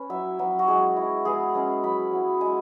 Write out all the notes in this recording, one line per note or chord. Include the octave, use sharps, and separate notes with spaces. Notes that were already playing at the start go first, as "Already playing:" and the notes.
Already playing: C#4 B4
F#3 E4 E5
F#3 B3 E4
F#4
G#3 E4 G#4
G#3 E4
G#3 B3 E4 G#4
G#3 C#4 E4
F#3 E4 B5
F#3 B3 E4
G#3 E4 G#5